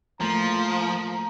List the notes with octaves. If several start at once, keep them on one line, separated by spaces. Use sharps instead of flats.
F3 A3 A#3 A#5